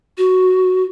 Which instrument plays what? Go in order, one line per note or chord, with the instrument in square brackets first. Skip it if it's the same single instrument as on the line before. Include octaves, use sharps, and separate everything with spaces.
[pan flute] F#4